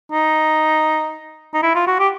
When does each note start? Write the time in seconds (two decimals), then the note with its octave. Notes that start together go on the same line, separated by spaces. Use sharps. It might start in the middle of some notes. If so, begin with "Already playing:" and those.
0.12 D#4
1.54 D#4
1.62 E4
1.75 F4
1.87 F#4
1.99 G4